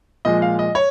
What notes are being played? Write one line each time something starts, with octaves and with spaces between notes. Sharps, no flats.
A#2 F3 G#3 D#5
F5
D#5
C#5